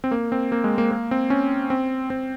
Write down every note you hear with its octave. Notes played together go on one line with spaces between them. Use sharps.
C4
A#3
C4
A#3
G#3
A#3
A#3
C4
C#4
C4
C4